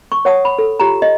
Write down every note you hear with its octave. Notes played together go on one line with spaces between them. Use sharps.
C#6
C#5 F#5 A5 D#6
B5
A4
F4 G4 A#5
D#5